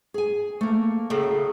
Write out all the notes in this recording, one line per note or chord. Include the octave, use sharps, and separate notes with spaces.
G#4 G#5
A3 A#3
A2 C#3 F#3